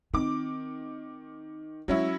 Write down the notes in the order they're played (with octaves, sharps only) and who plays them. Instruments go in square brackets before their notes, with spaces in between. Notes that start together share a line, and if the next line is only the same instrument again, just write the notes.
[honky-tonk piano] D#3 D6 [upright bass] C4
[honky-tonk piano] F#3 C#4 E4 [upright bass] G#3